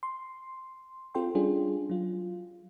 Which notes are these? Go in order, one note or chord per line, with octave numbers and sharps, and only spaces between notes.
C6
C4 F4 A4 G5 C6
G3 C#4 D4 F4 G#4
F#3 F4